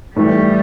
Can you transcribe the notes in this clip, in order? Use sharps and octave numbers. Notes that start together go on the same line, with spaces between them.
A2 E3 G3 A3